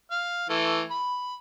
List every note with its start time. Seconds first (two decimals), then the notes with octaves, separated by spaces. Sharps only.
0.11 F5
0.49 E3 A3
0.91 B5